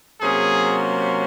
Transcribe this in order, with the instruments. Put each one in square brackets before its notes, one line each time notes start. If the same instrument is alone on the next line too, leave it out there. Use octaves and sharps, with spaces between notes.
[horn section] C3 F#3 A#3 C#4 G#4